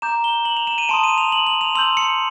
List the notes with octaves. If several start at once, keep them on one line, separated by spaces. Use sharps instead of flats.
A#5 D6 G6 E7
G7
F#7
F7
E7
D#7
A5 C6 D#6 D7
D#7
F7
F#7
F#7
F7
C6 E6 G6 F#7
C#7